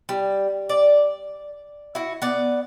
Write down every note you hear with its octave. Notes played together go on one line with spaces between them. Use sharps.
G3
D5
E4 F#4
B3 D5